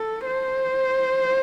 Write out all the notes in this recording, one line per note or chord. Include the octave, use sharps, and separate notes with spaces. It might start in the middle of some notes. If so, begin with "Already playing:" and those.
Already playing: A4
C5